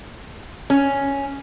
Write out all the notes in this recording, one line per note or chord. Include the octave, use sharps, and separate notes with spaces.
C#4